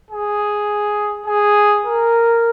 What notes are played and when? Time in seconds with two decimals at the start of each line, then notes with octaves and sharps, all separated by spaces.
0.11 G#4
1.26 G#4
1.85 A#4